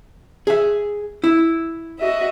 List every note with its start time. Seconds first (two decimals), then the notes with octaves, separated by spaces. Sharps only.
0.47 G#4 E5
1.24 E4
2.00 F#4 D#5 E5